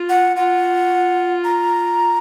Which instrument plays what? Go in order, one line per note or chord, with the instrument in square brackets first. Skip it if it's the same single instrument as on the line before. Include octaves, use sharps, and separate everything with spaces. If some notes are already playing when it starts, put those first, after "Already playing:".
Already playing: [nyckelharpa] F4
[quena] F#5
[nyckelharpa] F4 [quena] F#5
[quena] A#5